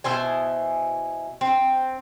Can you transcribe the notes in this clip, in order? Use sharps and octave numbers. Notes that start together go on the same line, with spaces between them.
B2 E4 C5 G#5
C4